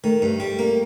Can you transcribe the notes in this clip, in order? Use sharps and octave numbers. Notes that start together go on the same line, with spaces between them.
D#3 A3
G2
G3
A#3